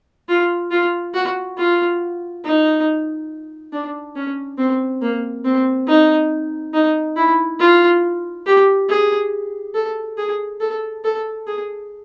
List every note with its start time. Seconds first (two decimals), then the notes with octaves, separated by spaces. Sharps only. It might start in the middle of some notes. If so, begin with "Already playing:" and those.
0.29 F4
0.71 F4
1.14 F#4
1.57 F4
2.44 D#4
3.73 D4
4.16 C#4
4.58 C4
5.02 A#3
5.45 C4
5.87 D#4
6.74 D#4
7.16 E4
7.60 F4
8.46 G4
8.89 G#4
9.74 A4
10.17 G#4
10.60 A4
11.04 A4
11.47 G#4